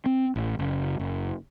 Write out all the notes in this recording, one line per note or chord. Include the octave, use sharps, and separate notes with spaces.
C4
A1
F#1
F#1